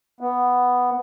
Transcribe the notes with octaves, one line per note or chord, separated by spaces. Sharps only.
B3